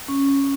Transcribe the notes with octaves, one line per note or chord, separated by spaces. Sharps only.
C#4